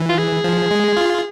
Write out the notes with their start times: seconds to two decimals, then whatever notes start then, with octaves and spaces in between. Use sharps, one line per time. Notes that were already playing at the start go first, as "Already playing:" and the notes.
Already playing: E3
0.09 F4
0.18 G#4
0.44 F3
0.71 G#3
0.97 F4